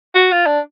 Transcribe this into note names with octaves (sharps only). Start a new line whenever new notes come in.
F#4
F4
D4